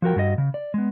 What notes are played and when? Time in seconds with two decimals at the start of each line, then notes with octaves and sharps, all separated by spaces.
0.02 F3 F#4 A#4 G5
0.16 G2 F#4 G4 D#5
0.38 C#3
0.54 D5
0.74 G#3 B3